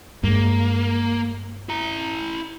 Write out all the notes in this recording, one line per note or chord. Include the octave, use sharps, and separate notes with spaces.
G2 G#3 A#3
E4 A#5